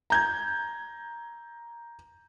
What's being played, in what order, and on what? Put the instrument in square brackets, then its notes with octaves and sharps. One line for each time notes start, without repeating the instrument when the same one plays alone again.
[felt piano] A#5 G6 G#6